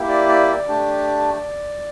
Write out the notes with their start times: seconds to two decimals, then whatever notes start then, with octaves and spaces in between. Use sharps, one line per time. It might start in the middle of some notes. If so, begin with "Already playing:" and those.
Already playing: A#3 E4 G4
0.09 D5
0.29 D5
0.48 D5
0.68 A3 D4 G4